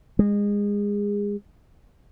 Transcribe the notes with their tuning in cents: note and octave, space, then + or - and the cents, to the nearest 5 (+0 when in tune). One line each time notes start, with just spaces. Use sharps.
G#3 -25